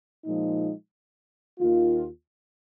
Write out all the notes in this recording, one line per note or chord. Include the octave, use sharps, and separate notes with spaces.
A#2 F3 G#3 D#4
D#2 D#3 A#3 F4